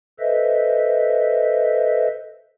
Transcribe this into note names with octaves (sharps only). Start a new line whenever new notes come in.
A4 B4 C5 D#5 E5